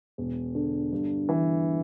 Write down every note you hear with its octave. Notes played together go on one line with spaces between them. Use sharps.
E1
D3
G2
E3